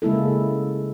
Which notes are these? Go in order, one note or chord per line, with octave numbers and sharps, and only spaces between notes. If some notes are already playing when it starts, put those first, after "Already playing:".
C#3 G#3 A#3 E4 A4